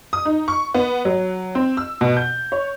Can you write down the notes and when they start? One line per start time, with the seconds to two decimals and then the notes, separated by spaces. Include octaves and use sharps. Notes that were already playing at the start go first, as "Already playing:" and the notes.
0.13 D#6
0.25 D#4
0.48 C#6
0.74 B3
1.05 F#3
1.55 C4
1.77 E6
2.01 B2
2.17 G6
2.52 C#5